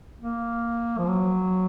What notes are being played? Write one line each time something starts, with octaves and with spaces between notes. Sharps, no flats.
A#3
F3
F#3